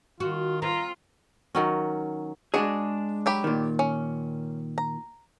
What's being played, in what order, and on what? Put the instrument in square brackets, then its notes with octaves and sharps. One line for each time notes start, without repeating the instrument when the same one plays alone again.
[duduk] D#3 [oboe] F4 [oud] F#4
[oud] C4 [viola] F4 [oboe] A#5
[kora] D#3 F#3 C#4
[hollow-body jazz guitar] G#3 D4 G#4 [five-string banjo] F#4 D#5
[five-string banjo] F#3 G4 B5
[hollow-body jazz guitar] A#2 D#3
[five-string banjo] C#4
A#5